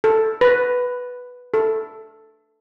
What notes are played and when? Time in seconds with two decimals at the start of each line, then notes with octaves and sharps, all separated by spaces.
0.04 A4
0.41 B4
1.54 A4